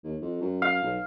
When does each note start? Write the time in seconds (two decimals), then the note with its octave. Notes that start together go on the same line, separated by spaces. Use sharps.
0.04 D#2
0.21 F2
0.41 F#2
0.62 F5
0.83 B1